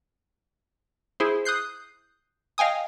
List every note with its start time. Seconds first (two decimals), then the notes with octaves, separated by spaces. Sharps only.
1.20 E4 G#4 C5
1.45 D#6 F#6 G6 C7
2.58 D#5 F5 G5 G#5 D#6